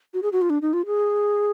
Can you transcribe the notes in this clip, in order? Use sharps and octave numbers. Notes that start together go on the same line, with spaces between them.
F#4
G#4
F#4
F4
D4
D#4
F4
G#4